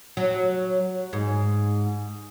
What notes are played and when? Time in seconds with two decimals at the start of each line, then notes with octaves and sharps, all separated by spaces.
0.17 F#3
1.13 G#2